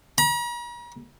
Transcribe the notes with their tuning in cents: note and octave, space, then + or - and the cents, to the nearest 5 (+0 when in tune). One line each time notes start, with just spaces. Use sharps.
A#5 +45